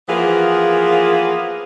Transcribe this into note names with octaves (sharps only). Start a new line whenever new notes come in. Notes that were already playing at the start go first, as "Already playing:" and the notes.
E3 F3 A#3 B3 G#4